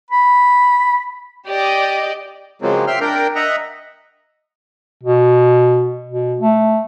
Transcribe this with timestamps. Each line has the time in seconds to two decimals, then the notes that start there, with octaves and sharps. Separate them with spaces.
0.11 B5
1.47 G4 D5 D#5
2.62 C#3 F3 F#3 G#3 A#3 C4
2.87 E5 G5 C6 F6
3.01 D4 A#4 G5
3.35 D#5 E5 F#5 A#5
5.04 B2
6.09 B2
6.39 A3